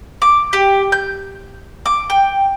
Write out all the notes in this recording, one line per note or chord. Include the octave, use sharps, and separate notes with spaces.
D6
G4
G6
D6
G5